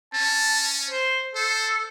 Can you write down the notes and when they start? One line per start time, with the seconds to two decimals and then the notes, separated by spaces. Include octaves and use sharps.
0.13 C#4 A5
0.90 C5
1.35 A4 C5